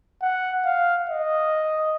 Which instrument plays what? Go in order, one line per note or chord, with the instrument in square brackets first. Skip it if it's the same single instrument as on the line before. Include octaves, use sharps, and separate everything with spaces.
[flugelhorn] F#5
F5
D#5